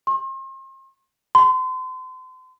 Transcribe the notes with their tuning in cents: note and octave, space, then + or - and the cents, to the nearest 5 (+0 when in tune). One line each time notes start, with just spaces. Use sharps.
C6 +40
C6 -35